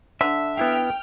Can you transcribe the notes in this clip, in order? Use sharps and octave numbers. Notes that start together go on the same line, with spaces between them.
D3 E5
B3 E4 F5 G5 F6